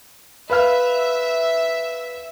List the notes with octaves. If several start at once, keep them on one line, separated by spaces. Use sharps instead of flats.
B4 E5 F5 F6